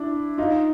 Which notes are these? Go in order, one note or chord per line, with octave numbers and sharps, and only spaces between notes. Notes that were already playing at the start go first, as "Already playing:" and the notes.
Already playing: D4 E4
D#4 F4